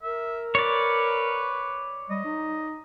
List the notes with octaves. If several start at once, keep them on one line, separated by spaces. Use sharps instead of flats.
A#4 E5
B4 C#5 D5
G3 D#5
D#4